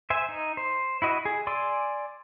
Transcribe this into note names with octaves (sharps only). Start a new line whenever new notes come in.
C5 E5 G#5
D#4
C5
E4 F#4 D#5
G#4
D5 G#5 C6 D6 E6